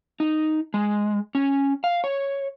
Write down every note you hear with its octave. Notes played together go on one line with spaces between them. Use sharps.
D#4
G#3
C#4
F5
C#5